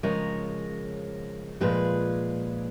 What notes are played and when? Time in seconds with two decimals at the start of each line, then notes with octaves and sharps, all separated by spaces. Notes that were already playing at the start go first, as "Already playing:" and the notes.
0.03 C#3 F3 G#3 A#4 C#5
1.61 A#2 F3 G#3 G#4 B4